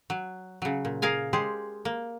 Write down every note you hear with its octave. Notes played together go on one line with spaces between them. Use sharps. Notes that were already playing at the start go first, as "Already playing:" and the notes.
F#3
C#3 F#3
A#2
G#4 A#4 F5 G#5
G#3 G4 G#4 C5
A#3